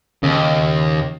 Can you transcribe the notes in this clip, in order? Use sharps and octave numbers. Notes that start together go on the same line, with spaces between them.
D#2 C#3